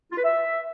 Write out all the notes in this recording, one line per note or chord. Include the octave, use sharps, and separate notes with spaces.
F4
B4
E5